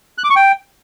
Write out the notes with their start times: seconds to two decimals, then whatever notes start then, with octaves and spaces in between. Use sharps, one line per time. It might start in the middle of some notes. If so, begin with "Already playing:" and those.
0.18 F#6
0.24 D6
0.30 C#6
0.36 G5